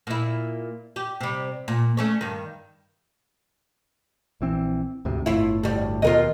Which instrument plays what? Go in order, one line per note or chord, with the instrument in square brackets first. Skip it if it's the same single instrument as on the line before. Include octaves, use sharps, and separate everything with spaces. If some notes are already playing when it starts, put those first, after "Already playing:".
[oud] A#2 E4
G4
C3 G3
A#2
A3 C#4 C#5
G2 D#3
[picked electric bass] A#1 E3 C4
D2 G#2 C3
[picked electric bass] G1 A2 [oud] E4 F4
[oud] D2 G3
[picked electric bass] D#2 B2 [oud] F4 A#4 D#5